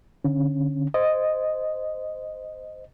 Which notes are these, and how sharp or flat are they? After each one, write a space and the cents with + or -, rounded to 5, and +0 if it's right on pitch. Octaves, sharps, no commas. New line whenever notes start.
D3 +0 C#4 -20
C5 -10 D#5 -5